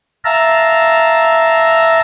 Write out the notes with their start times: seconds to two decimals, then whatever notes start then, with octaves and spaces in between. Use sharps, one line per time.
0.25 E5 F5 A5 A#5